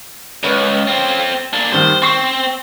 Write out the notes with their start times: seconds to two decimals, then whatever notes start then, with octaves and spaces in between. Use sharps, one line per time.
0.43 C#2 C#4 B4
0.88 C4 F4
1.53 A#3 D4
1.72 D#2 D#3 G3 C5
2.02 C4 C6 C#6 C7